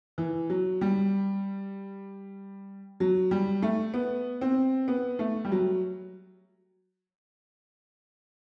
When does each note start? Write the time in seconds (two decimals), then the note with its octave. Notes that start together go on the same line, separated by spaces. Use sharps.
0.18 E3
0.50 F#3
0.81 G3
3.00 F#3
3.31 G3
3.62 A3
3.94 B3
4.41 C4
4.88 B3
5.19 A3
5.45 G3
5.52 F#3